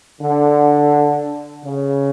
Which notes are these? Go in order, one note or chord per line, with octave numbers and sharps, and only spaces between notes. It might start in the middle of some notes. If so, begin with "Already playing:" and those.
D3
C#3